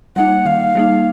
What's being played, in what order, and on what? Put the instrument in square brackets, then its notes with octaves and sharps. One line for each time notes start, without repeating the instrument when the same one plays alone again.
[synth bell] G3 A#3 D#4 [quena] F#5
[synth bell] D#3 [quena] F5
[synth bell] G3 A#3 D#4